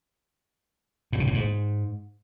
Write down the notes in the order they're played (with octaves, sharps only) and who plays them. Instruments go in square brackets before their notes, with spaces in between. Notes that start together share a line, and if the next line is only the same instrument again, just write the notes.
[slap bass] A2
C#3
A2
G#2